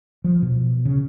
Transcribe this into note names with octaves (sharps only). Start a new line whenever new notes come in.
F3
B2
C#3